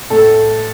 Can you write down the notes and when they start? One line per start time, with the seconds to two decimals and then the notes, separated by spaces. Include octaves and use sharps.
0.10 A2 A4